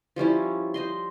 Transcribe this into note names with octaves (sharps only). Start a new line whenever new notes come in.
F3 G3 C#4 E4
C5 D#5 C6